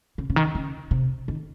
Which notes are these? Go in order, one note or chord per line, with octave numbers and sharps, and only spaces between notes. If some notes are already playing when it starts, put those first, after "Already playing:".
C#3
C#3
D#3
C#3
C3
D#3